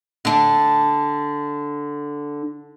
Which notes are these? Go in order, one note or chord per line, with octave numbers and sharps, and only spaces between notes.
D3 D4